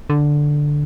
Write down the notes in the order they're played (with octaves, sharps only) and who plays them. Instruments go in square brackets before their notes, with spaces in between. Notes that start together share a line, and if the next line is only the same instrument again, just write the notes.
[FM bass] D3